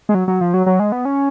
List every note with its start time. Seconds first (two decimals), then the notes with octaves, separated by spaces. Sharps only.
0.09 G#3
0.14 F#3
0.28 F#3
0.41 F3
0.54 F#3
0.66 F#3
0.79 G#3
0.92 B3
1.05 C#4